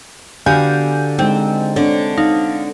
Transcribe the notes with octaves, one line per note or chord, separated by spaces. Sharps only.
D3 B3 F#4 G4 F5 G#5 G6
G#3 C4 D#4
D3 C4 D4 C#5
D#4 F5